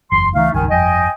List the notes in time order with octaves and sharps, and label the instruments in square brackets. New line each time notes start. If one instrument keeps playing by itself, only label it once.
[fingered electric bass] F#1 E2 [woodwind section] C6
[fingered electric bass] C#2 C#3 E3 [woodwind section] A3 D#4 F5
[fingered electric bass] F#1 C#2 G2 [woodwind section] D#3 D#4 G#5
[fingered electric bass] G1 F2 [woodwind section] D#5 G5 G#5